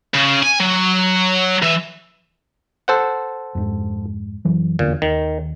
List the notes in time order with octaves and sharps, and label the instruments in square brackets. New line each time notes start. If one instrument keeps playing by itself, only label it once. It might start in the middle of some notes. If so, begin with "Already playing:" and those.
[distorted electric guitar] C#3
G#5
F#3
E3
[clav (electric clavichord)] A4 C5 F#5
[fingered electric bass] F2 G#2
F#2 E3 F#3
[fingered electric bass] F1 E2 D3 [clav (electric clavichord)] A#2
[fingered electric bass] D#2 [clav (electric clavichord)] D#3